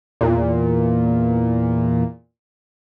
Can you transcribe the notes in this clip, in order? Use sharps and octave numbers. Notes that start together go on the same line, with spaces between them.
E2 A#2